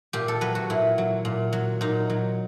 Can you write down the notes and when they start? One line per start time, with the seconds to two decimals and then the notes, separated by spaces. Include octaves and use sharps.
0.13 A#2 G4
0.28 A4
0.41 F#3 B4
0.55 F#4
0.70 A#2 E4
0.98 F#3
1.25 A#2
1.53 F#3
1.81 A#2 D#4
2.10 F#3